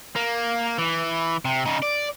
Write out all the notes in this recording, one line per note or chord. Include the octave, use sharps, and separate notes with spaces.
A#3
E3
C3
C#3 D#4
D5